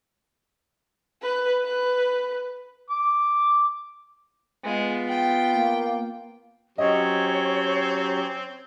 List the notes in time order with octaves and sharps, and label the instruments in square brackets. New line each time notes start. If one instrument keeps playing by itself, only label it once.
[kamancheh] B4
B4
[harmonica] D6
[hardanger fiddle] G#3 [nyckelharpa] B3 F4
[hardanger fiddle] G5
[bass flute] A#3
[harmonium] F#3 C#4 G4 [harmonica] C4 [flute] C#5 [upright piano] D#5